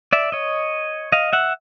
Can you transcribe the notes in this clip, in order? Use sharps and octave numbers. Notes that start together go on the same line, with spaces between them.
D5 E5
C#5 D#5
D#5 F5
E5 F#5